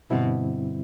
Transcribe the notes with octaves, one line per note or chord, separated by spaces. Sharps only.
G2 B2 D3 G3 C4 E4